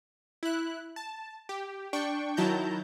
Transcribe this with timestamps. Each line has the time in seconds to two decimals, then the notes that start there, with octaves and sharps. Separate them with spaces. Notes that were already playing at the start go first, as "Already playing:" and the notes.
0.43 E4 F#6
0.96 A5
1.49 G4
1.93 D4 G5 C#6
2.37 D#3 F#3 E4 A5 A#5 G6